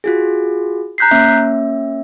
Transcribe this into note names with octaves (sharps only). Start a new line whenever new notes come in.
F4 F#4 G#4
A#5 F#6 G6 B6 C7
A#3 C#4 E5